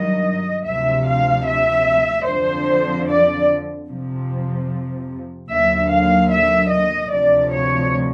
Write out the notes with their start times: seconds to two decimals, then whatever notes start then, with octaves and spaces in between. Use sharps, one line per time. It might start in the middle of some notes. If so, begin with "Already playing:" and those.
Already playing: G2 D#3 F#3 D#5
0.65 D2 C3 F3 E5
1.06 F5
1.46 E5
2.26 F2 D3 F3 C5
3.07 D5
3.87 F2 C3 F3
5.49 D#2 D3 F#3 E5
5.90 F5
6.30 E5
6.70 D#5
7.10 D2 C3 F3 D5
7.51 C#5